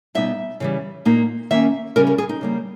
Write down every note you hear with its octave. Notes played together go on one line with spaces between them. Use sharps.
B2 G3 B3 D#4 E5
C#3 E3 G3
A#2 A#3 D#4
D#3 A#3 C#4 E5
C#3 G3 C#4 A#4
A#4
G#4
D#4
C#3 G3 A#3